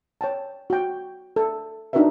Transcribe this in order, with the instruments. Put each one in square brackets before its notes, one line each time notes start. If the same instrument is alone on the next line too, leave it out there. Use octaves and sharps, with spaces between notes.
[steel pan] C#5 G5 A5
F#4 G5
A4
D4 D#4 F#4 A#4 B4 E5